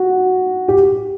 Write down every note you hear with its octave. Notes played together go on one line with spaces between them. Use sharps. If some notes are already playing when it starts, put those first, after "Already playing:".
Already playing: F#4
G4